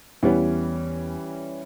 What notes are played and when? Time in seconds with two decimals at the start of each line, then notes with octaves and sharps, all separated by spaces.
0.23 E2 E3 G3 B3 C#4